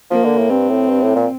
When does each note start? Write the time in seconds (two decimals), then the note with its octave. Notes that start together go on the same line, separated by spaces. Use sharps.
0.11 F3 A#3
0.24 D3
0.38 A2
0.50 G2 C4
0.70 A2
0.90 G2
1.03 A2
1.15 A#2